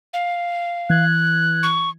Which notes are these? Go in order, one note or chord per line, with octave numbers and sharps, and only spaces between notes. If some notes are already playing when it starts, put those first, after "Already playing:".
F5
E3 F#6 G#6
C#6